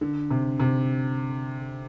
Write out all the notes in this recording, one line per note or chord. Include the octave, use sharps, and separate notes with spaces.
D3
C3
C3